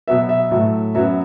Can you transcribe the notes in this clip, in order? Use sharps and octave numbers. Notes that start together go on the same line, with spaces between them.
B2 F#3 B3 E5
E5
A2 F#3 A3
F#2 F#3 B3 E5